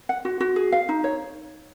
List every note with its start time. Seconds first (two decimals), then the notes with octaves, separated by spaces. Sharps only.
0.09 F#5
0.25 F#4
0.40 F#4
0.56 G#4
0.72 F5
0.89 D#4
1.04 C#5